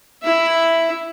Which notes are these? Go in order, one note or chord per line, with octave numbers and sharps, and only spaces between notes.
E4 E5